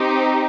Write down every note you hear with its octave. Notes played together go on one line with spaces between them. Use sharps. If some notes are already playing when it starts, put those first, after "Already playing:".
Already playing: C4 D#4 G4